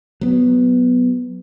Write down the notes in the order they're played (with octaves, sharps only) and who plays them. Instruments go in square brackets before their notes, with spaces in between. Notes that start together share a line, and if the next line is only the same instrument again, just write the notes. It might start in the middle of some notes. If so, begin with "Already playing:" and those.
[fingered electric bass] F#3 B3